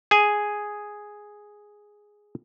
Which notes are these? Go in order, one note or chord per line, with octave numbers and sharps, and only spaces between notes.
G#4 G#5